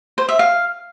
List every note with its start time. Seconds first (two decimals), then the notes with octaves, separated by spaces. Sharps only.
0.18 C5
0.29 E5
0.39 F5